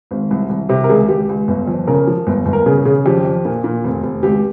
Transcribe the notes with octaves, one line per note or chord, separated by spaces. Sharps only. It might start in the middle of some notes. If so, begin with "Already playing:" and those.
G#1
C2
C2
C3 G4
A#4
C#2 G#4
C#2 G4
C#2
G1
F2
C#3 A#4
F3
G1
G1
A#4
C#3 G#4
C#3 G#4
F2 G4
F2
A#2
A#2
F1
F1
C#2 G4